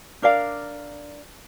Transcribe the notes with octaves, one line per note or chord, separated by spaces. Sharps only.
D4 A#4 D5 F5